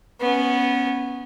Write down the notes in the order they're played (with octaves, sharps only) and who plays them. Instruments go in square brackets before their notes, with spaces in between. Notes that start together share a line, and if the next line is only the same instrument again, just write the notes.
[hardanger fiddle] B3 C#4